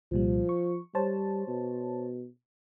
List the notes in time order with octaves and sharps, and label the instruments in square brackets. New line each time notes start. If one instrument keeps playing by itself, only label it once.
[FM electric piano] C2 A#2 G3 [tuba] F3
[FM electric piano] C#6
[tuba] G3 [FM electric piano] C5 C#5 A5
[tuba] B2